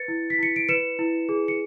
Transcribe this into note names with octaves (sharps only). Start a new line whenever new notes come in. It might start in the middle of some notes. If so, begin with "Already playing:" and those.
Already playing: B4 A6 C#7
E4
B6
E4 C#7
D7
B4 C#7 E7
E4
G#4
C#7